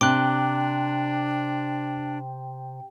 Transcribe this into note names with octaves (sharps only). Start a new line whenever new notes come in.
C3 D4 G5 D6 F#6